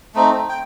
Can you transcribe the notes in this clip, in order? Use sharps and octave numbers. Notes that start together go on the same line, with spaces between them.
A3 C4 D#4
G5